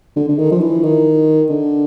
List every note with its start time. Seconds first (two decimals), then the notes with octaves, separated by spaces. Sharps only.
0.16 D3
0.28 D3
0.38 D#3
0.52 F3
0.61 E3
0.83 D#3
1.50 D3